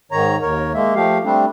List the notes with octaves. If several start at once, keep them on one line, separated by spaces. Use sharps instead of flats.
G#2 D#3 C#5 A#5
D#2 A#4 C#5
G#3 A#3 E5
F3 A3 G4 F5
G3 A3 C4 D4